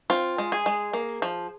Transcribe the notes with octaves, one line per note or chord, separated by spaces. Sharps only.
C4 F4
G#3
G#4
G#3
A#3
F3